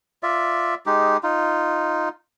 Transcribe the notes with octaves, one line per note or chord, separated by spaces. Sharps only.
F4 D5 E5
G#3 D#4 G4
D#4 F4